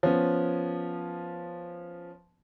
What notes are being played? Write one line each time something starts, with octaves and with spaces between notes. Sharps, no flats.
F3 B3 C#4